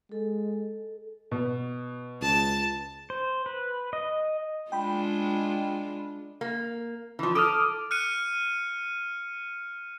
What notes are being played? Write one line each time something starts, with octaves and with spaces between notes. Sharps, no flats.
G#3 A4
B2
C#2 A5
C5
B4
D#5
G#3 D4 F4 G5 B5
A#3
E3 F3
A4 D6 D#6 F6
F6 F#6 C#7 D#7